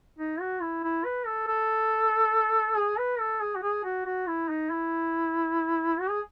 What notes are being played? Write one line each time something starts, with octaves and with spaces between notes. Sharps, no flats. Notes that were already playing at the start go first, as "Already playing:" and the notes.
D#4
F#4
E4
E4
B4
A4
A4
G#4
B4
A4
G#4
F#4
G#4
F#4
F#4
E4
D#4
E4
F#4
G#4